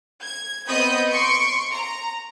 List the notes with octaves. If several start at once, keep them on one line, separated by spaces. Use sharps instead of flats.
G#6
B3 C4 D#5 B5 D#6 G6
C6 C#6 C#7 D7
A#5